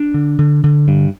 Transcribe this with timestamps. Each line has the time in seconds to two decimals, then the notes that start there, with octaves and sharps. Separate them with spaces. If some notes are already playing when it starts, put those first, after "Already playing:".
Already playing: D4
0.14 D3
0.39 D3
0.64 D3
0.88 G2